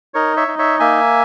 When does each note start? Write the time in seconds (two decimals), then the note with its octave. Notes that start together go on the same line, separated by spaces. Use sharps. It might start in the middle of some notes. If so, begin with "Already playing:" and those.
0.14 D#4 A#4 C#5
0.37 C#5 E5
0.48 D#4
0.59 C#5 E5
0.80 A#3 E5 G#5